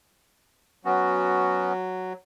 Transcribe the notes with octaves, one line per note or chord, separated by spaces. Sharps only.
F#3 B3 C#4 F#4